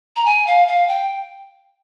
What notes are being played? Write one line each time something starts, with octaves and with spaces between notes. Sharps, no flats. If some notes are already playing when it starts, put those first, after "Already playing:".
A#5
G#5
F5
F5
G5